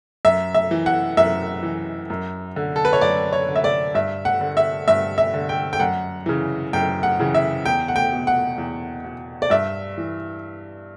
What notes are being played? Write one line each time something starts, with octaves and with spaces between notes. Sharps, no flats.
F#2 E5
E5
E3
F#5
F#2 E5
E3
F#2
D3
A4
B4
C#5
F#2 D5
C#5
D3
E5
D5
G2 E5
F#5
D3
E5
G2 E5
E5
D3
G5
G5
F#2 F#5
C#3 E3
F#2 G5
F#5
C#3 E3
E5
E2 G5
F#5
G5
B2
F#5
E2
B2
D5
G2 E5
E3